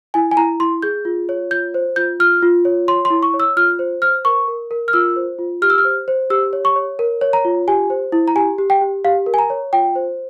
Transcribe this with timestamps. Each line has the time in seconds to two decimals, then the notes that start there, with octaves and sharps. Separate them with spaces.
0.14 E4 G#5
0.31 G#5
0.37 E4 A#5
0.60 E4 C6
0.82 G#4 G6
1.05 F4
1.29 C#5
1.51 F4 G6
1.74 C5
1.96 F4 G6
2.20 F4 F6
2.43 F4
2.65 C#5
2.88 C#5 C6
3.05 C6
3.10 E4
3.23 C#6
3.34 C#5
3.40 E6
3.57 F4 F6
3.79 C5
4.02 C5 F6
4.25 A#4 C#6
4.48 A#4
4.71 A#4
4.88 F6
4.93 F4 E6
5.16 C5
5.39 F4
5.62 G4 F6
5.70 E6
5.78 F6
5.85 C5
6.08 C5
6.30 G4 E6
6.53 C#5
6.65 C#6
6.76 C#5
6.99 A#4
7.21 C#5
7.33 A#5
7.45 F4
7.68 G4 G#5
7.90 C5
8.12 E4
8.28 A#5
8.35 G4 G#5
8.58 G4
8.70 G5
8.81 G4
9.05 G4 F5
9.26 A#4
9.34 G#5
9.39 A#5
9.50 C#5
9.73 F4 G5
9.95 C5